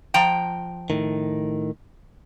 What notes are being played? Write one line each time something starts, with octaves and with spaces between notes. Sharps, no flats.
F3 G5 A#5
A2 D#3